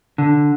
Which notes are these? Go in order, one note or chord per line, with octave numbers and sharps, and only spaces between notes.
D3